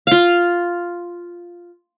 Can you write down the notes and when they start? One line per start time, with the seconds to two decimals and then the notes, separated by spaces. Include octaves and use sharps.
0.07 F4 F5